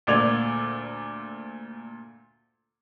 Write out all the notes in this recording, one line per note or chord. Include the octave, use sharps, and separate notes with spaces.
D2 A#2 D5 G#6 F7